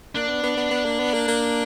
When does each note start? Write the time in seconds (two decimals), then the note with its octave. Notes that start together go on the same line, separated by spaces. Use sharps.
0.15 A#3 D4
0.29 B3
0.43 B3
0.57 B3
0.71 B3
0.85 A#3
1.00 B3
1.14 A#3
1.28 A#3